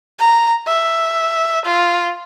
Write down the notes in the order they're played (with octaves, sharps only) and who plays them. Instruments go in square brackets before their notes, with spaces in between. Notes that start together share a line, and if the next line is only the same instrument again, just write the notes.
[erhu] A#5
E5
F4